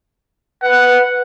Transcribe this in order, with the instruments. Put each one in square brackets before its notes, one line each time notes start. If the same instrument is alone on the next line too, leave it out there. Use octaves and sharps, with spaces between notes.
[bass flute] B4 [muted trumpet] F#5